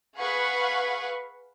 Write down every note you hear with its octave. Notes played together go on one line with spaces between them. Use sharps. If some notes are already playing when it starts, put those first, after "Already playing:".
G#4 B4 F5 F#5 B5 C#6